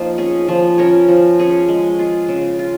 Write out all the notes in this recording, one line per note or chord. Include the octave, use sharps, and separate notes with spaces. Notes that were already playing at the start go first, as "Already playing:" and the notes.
Already playing: F3 A#3 D#4
C#4 G#4
F3
C#4 A#4 C#5
F3
C#4 G#4 C#5
G#3
F4 G#4
C#3
F4